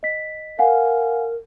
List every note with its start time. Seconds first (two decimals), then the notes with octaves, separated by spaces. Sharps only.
0.03 D#5 B6
0.59 A#4 F5 F#5 G#5